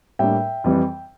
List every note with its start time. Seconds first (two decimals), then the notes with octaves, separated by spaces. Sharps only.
0.19 A2 G3 A#3 D4 E5 G5
0.64 F2 E3 G3